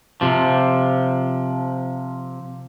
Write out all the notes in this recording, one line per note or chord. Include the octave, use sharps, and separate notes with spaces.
C3 F3